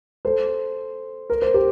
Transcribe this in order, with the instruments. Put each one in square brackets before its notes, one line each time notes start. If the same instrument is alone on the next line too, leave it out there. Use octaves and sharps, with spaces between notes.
[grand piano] A4 C5
A#4
C5
G4 A#4